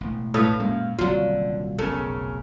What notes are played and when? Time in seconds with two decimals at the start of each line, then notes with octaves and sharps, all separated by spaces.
0.01 E1 A1
0.34 A2 A4 B4 C#5 F5 D#6
0.60 F#2 A#2 G#3
0.99 D#1 C2 D3 F#3 F4
1.79 F1 B1 C#3 C#4 A4 A#4